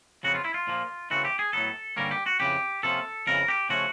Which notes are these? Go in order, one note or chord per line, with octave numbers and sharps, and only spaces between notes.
F2 C#3 F#3 B3 F#4
F4
E4
F4
A#2 F3 A#3
C#3 E3 A3 C4 F#4
G4
G#4
A2 F#3 B3 A4
G2 D3 G3 A#3 C#4 A#4
G4
F#4
F2 C#3 E3 G4
C3 F3 A#3 C#4 A4
F2 C#3 E3 A#4
G4
C#3 F3 A3 C#4 F#4